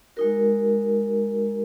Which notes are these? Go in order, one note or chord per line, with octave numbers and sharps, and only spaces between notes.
G#3 D#4 F#4 A#4